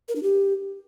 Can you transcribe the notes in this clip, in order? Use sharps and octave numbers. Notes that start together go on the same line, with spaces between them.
A#4
D4
G4